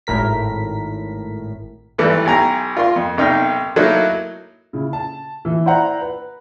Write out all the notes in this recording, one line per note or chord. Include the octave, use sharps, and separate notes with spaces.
G#1 A2 A#4 B6
G#1 E3 G3 A3
B1 G4 G#5 A#5
F4 A#4 C6
F2
B1 C3 A#3 D#4 G5 F6
F#3 A3 A#3 D#4 E4
C#3 E4
A5
E3
E4 C5 D5 F#5 A#5
B4